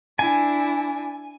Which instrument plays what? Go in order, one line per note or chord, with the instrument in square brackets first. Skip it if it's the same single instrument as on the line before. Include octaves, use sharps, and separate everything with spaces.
[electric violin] D4 E4 [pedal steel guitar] G#5